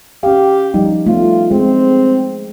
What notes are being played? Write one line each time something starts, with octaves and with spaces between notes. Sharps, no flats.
C#4 G4 F5
F3 G3 D#4
A3 B3 F4
G#3 C4